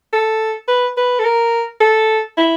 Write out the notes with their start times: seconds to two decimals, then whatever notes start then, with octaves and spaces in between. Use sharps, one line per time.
0.13 A4
0.68 B4
0.97 B4
1.19 A4
1.24 A#4
1.81 A4
2.38 E4